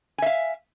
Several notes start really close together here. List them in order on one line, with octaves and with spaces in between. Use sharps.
G#5 E5 F5